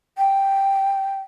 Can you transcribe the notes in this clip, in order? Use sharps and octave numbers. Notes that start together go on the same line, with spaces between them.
G5